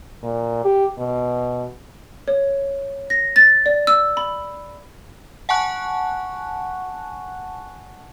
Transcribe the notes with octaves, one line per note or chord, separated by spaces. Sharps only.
A#2
G4
B2
C#5
A#6
A6
D5
E6
B5
F#5 G#5 A5 C#6 F#6